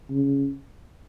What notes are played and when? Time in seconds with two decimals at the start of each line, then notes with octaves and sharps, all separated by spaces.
0.10 C#3